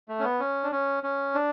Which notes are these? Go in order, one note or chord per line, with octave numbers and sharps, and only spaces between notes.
A3
C#4
B3
C#4
D4
C#4
C#4
D4